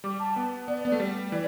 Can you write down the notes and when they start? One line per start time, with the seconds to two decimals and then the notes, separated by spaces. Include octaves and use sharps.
0.04 G3 D6
0.20 A5
0.36 B3
0.68 B3 D5
0.85 B3
0.92 A3
1.00 G3
1.32 E3 D5